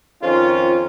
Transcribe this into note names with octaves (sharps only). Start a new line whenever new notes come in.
F2 D#3 C#4 F4